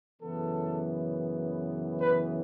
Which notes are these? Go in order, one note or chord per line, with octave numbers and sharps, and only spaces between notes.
F#2 C#3 E3 B3 A4
B4